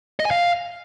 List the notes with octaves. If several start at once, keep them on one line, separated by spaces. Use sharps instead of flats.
D#5
G#5
F5